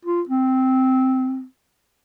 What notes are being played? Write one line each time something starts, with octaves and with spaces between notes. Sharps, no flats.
F4
C4